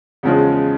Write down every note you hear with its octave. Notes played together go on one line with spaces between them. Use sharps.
E2 C#3 F3 G#3 C#4